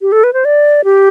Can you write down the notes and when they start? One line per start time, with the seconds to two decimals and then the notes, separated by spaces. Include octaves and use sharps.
0.02 G4
0.12 A4
0.24 B4
0.33 C5
0.45 D5
0.85 G4